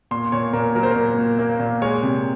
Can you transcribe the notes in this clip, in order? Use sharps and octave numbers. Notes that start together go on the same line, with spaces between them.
A#2 C6
A#2 C#5
A#2 A#4
F#3 A#4
C5
A#4
A#2
A#2
A#3
A#2
G#3 C#5
C3